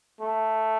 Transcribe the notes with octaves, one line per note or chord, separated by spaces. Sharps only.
A3